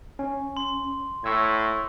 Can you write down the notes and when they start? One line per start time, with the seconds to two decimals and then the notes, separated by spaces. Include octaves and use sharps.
0.19 C#4
0.57 C6
1.24 A2 C#6 E6 G#6